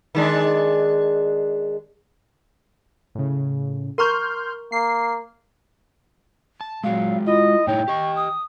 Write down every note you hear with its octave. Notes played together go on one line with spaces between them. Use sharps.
D#3 G#3 D4
A2 C#3
A#4 A#5 C6 C#6 F6 G6
A#3 C7
A5
A#2 F#3 G#3 F#4 F5
E4 F4 D#5
A2 D#4 E4 C#5 G5
G4 D#5 C#6
D#6